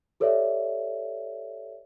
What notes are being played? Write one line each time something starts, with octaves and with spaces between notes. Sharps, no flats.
G4 A4 B4 C#5 D5 E5